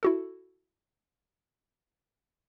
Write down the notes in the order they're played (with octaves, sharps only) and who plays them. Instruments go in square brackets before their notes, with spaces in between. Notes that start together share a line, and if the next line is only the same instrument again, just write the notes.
[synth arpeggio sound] E4 F#4 A4